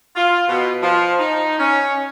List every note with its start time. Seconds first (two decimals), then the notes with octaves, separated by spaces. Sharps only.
0.16 F4
0.49 B2
0.83 F3
1.19 D#4
1.59 C#4